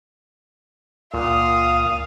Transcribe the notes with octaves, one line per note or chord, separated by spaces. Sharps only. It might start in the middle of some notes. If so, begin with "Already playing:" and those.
C#2 A#2 F5 F#5 D#6